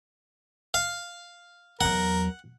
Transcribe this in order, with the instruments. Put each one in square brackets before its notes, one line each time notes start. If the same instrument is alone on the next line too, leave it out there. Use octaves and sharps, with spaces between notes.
[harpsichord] F5
[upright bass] E2 F#3 [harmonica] A#4 [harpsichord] F#5